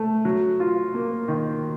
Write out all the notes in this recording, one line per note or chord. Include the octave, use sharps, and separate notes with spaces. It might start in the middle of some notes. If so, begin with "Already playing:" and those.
Already playing: A3
F#3
F4
A#3
D#3